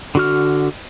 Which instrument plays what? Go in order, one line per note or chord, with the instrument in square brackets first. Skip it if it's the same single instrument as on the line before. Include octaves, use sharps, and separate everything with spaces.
[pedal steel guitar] D3 F#4 F6